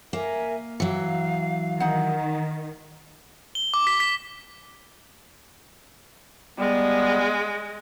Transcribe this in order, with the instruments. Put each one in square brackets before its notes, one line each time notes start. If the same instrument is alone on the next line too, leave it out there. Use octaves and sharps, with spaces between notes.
[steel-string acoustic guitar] A#3 [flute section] A#4 E5 G#5
[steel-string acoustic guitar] E3 F#3 [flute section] F5
[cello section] D#3 [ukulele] D#4 F#5
[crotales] G7
D6
B6
B6
[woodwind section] G3 B3 [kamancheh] G#3